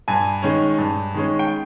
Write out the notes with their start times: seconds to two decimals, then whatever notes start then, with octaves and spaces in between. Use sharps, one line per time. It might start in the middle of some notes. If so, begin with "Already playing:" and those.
0.08 G2 G#5
0.43 D#3 G#3 C#4
0.78 G2
1.14 D#3 G#3 C#4
1.39 G5